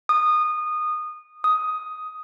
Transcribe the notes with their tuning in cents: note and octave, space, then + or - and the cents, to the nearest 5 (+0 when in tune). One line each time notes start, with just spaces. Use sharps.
D#6 -20
D#6 +5